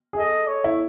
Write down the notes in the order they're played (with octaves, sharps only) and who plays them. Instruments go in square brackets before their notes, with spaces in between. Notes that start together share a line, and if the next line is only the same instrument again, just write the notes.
[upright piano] G#4
[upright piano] A4 [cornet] D#5
[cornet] C#5
[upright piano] E4